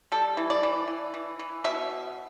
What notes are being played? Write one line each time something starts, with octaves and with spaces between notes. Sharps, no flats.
G3 A4
E3
D5
E3
E3
E3
E3
B2 E5